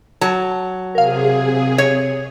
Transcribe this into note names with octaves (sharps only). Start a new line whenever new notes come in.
F#3 A5
C3 G#4 A#4 F5
C#5